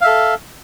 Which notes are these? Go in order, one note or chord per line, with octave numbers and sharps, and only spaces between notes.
A4 E5 F5